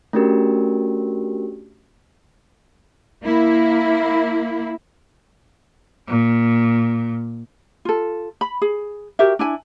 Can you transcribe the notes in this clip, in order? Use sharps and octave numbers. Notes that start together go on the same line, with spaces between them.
A3 C#4 D4 F#4 G4 A#4
A#3 E4
A#2
F4 A4
B5
G#4
F#4 G4 A#4 E5
D4 E4 G#5